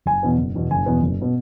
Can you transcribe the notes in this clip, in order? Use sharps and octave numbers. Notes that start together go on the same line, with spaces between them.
F#1 G#5
E2 B2 B3
F#1
E2 B2 B3
F#1 G#5
E2 B2 B3
F#1
B2 B3